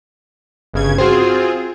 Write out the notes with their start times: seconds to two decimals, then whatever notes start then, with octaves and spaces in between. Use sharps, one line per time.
0.74 G1 C#3 G#6
0.98 C4 F4 F#4 G#4 C5